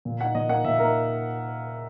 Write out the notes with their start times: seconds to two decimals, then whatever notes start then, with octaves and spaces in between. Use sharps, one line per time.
0.05 A#2
0.20 A#3 D#4 F#5
0.35 A#2 D#5
0.49 A#3 D#4 F#5
0.64 A#2 E5
0.79 A#3 D#4 A#4